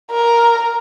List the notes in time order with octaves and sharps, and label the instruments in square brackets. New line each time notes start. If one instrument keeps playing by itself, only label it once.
[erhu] A#4